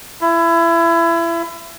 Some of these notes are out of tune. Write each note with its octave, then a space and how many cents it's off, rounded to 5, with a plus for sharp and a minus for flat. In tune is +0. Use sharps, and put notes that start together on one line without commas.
E4 +25